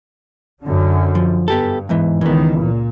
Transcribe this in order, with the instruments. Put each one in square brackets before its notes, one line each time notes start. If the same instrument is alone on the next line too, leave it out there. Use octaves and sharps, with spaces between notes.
[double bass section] F#2 D3
[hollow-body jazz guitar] F3
[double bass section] G2 [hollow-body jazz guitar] B3 G4 A4
[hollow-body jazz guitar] E2 G#2 E3
[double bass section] C#2 D#3 [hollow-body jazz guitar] E3 B3
[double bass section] A#2